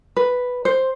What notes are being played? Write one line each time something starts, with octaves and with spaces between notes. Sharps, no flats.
B4
C5